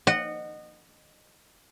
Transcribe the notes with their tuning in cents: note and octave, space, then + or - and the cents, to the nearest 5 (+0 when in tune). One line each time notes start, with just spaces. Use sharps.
D#5 -25 F#5 +0